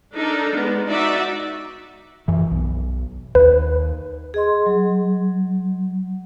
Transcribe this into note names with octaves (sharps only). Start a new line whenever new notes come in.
D4 D#4 A4 A#4
G#3 B3 D4
D#4 F#4 D5 E5
F#2 E3
B1
D#2 B4
G#4 D#5 C6
F#3